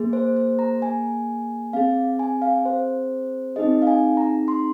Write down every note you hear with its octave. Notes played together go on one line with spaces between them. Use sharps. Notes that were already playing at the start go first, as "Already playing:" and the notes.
Already playing: A#3 G#4
C5
C5
A#5
G#5
C4 G#4 F5
G#5
F5
C5
C4 D#4 G#4 D#5
F5
G#5
A#5
C6